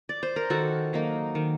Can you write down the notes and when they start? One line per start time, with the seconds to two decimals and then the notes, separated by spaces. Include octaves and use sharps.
0.09 D5
0.23 C5
0.36 A#4
0.50 D#3 F#4 A4
0.93 F#3 A#3 D#4
1.35 D#3